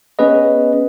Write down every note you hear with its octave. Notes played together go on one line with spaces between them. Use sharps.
B3 C#4 G#4 B4 D#5